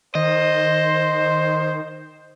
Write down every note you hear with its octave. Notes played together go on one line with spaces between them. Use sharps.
D#3 C5 D#5